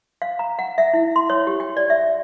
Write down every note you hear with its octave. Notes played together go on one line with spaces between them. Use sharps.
F5
A#5
F#5
E5
E4
C6
C#5
G4
G5
D5
E5